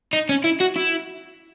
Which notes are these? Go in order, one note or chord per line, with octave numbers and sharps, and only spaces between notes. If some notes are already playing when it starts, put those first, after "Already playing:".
D#4
C#4
E4
F#4
E4